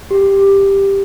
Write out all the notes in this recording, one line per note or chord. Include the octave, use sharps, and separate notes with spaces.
G4